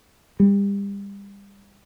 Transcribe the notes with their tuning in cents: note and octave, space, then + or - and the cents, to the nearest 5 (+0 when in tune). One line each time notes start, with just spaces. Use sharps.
G3 +30